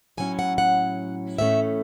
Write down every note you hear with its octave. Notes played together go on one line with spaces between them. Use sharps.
A2 F#3 C#4 E4 G#5
F#5
F#5
A2 E3 A3 C#4 E5